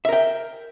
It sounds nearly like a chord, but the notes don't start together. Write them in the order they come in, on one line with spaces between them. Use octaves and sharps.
E5 A#4 G5